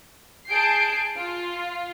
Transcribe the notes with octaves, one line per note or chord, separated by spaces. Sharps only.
G#4 A5 G6 C7 D7
F4